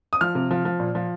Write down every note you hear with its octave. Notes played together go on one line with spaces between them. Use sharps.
D#6
F3 F6
C3
F3
F3
A#2
F3